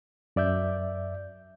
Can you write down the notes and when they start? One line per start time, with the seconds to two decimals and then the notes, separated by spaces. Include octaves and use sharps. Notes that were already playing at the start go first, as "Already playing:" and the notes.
0.36 F#2 D5 E5 G6